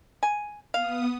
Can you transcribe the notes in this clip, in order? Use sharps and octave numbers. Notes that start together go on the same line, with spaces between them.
G#5
B3 F5 D#6